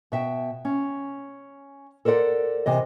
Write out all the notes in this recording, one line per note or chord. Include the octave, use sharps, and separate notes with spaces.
B2 E5 G5
C#4
A4 A#4 C5 D5 F#5
C3 E3 D#5